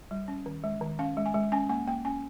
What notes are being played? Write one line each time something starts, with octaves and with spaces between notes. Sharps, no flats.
G3
C#4
D#3
G#3
D#3
C#4 F5
G#3
G#5
G#3
C#4 G#5
A#3 G#5
A#3 G5
C#4 G#5